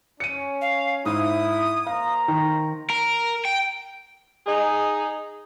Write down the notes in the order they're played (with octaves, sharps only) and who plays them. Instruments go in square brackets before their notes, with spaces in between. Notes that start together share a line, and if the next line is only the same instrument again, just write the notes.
[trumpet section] C#4 [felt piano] C#7 D#7
[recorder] F5
[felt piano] G#2 [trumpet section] E4 [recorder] D#6
[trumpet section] A#3 C5 A#5 [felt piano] F5
[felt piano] D#3
[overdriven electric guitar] A#4
G5
[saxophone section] D#4 G#4